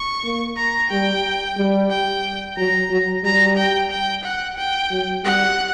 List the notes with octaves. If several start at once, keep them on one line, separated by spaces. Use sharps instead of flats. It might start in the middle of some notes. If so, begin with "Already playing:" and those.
Already playing: C#6
A#3
A#5
G3 G5
G3
G5
F#3 A#5
F#3
G3 A#5
G5
G5
F#5
G5
F#3
G3 F#5